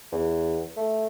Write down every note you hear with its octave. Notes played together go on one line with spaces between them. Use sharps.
E2
A3